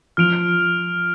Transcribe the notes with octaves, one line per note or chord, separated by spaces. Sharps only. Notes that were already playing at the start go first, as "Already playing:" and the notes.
F3 F6 D7 F7